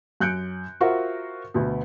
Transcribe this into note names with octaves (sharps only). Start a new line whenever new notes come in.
F#2 F#6 G6 C#7 D7
F4 F#4 A#4 C5 E5 F#5
D2 B2 B3